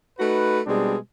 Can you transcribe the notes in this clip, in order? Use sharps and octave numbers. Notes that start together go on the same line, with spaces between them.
A3 D#4 F#4 B4
B2 G3 G#3 C4 D4